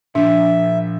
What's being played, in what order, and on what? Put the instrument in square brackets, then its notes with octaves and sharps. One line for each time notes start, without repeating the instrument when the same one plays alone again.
[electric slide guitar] A#2 F3 [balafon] D4 [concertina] E5